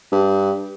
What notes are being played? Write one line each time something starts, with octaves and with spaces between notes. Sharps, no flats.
G2